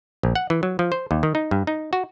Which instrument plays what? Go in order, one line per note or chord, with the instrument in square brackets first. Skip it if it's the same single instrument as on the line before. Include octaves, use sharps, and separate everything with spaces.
[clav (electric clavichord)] A#1
F#5
E3
F#3
F3
C5
D#2
D#3
D#4
G2
D#4
F#4